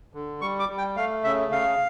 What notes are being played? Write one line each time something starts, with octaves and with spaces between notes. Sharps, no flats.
D3
G3 C#6
D6
G3
G5
A3 F5
C#3 E5
C#3 F5